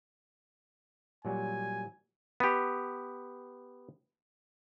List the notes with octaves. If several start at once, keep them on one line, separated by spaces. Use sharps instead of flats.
A#2 F#3 G3 G#5
B3 G4